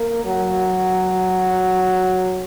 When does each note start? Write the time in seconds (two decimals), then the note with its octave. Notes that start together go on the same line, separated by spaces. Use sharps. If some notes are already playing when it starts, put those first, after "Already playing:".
Already playing: A#3
0.25 F#3